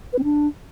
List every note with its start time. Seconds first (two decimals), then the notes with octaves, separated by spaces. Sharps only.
0.13 B4
0.18 C4
0.24 D4